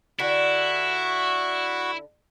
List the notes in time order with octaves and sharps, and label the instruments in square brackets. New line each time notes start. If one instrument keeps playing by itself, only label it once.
[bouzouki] D3 G4 B4 [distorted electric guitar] E4 [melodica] F#4 C#6